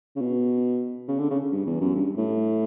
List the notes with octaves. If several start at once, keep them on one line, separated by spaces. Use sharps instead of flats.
C#3
B2
C#3
D3
C#3
G2
E2
F#2
G2
A2